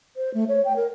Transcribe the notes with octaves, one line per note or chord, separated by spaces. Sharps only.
C5
A3
C#5
G5
A#4